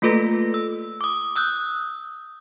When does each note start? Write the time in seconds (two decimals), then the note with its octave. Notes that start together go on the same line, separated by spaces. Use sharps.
0.02 A3 A#3 F4 A4 B4 A#6
0.54 E6
1.01 D6 D#6
1.36 D#6 E6 F#6 G6